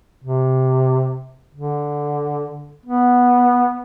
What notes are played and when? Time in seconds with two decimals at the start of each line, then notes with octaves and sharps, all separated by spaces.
0.24 C3
1.54 D3
2.86 B3